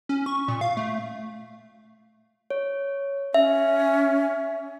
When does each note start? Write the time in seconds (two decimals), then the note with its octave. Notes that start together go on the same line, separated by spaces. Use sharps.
0.09 C#4
0.26 C#6
0.48 A#2
0.61 F5
0.77 A3
2.50 C#5
3.34 C#4 E5